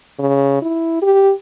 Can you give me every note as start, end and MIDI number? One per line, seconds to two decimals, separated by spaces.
0.19 0.58 49
0.62 1.00 64
1.02 1.32 67